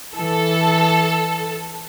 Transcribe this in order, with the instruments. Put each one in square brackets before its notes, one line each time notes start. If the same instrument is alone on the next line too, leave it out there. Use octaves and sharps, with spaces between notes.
[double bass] E3 [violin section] A4